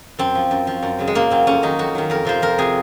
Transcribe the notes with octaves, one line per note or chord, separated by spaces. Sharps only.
F#2 C4
F3
F#2
F3
F#2
C#3 F#3
G#3
F#2 A#3
C#3 F#3 C4
F2 C#4
D#3 F#3 D#4
F2 F#4
D#3 F#3
F2 A#4
C3 F3 C5
F2 A#4
C3 F3 G#4